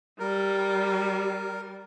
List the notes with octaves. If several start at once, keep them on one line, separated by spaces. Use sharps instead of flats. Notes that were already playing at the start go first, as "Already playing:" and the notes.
G3 A#4